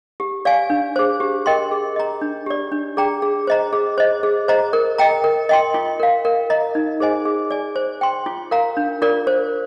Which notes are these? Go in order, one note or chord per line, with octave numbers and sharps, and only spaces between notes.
G4
D5 F5 G#5
D4
G#4 C5
G4
A#4 D#5 G5 C6
G#4
D#5 A#5
D4
G4 D5
D4
G#4 D5 G5 A#5
G#4
C5 D#5 A#5
G#4
C5 D#5
G#4
C5 D#5 A#5
A#4
D#5 G5 A#5
A#4
D#5 G5 C6
F4
A#4 F5
A#4
D#5 A#5
D#4
G#4 C5 D#5 G#5
G#4
D5 G#5
C5
G5 C6
F4
A#4 F5 A#5
D4
F4 A#4 D5
C5